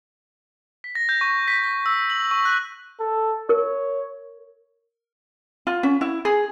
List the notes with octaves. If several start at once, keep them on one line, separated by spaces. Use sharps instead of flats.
B6
A#6
G6
C#6
B6
B6
E6
F#7
C#6
F#6
A4
A#4 C#5
F4
C#4
E4
G#4